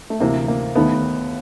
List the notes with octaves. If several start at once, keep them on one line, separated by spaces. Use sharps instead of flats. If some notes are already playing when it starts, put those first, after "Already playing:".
A3
D2 C3 E3 A#3
A#3
D#2 D#3 A3 B3